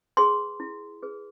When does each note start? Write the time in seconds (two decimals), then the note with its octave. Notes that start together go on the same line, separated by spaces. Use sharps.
0.17 G#4 B4 C6
0.60 E4
1.03 G#4 B4